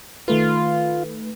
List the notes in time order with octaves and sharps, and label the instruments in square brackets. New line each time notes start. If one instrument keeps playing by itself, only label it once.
[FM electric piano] D#3 A3 B4 [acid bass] F4